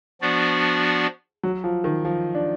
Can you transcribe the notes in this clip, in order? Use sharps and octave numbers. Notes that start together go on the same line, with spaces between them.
F3 B3 D4 F#4 D5
F#3
F3
D#3
F3
D4